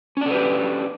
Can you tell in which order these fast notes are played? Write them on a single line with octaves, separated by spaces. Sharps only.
C#4 D4 A4 B4 G4